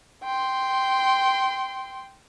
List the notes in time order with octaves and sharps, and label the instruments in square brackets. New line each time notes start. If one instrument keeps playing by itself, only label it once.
[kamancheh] G5 C6